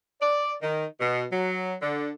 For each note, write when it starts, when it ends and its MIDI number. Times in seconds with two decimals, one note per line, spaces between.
0.20 0.53 74
0.61 0.86 51
1.00 1.24 47
1.31 1.74 54
1.82 2.11 50